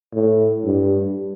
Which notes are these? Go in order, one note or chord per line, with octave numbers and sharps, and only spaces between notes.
A2
G2